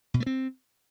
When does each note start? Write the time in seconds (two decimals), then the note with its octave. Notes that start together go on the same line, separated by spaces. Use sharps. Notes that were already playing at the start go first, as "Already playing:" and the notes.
0.14 B2
0.20 A3
0.26 C4